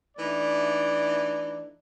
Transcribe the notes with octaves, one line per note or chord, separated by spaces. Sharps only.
E3 A3 D4 D#4 D5